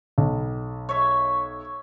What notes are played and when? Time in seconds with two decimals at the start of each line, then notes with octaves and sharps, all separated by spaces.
0.18 B1
0.89 C#5 E5